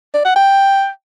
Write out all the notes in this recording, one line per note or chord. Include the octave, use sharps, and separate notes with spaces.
D5
F#5
G5